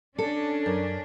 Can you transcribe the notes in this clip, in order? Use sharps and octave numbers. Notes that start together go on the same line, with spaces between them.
C#4 D4 A4
F#2